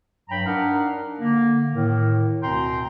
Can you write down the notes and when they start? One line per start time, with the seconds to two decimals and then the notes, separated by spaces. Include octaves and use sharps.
0.29 G2 F#3 G5 A#5 B5
0.46 D4 D#4 A#4 F5 F#5
1.20 D3 A#3
1.72 A2 D#3
2.42 D2 B2 C4 G5 A#5 C6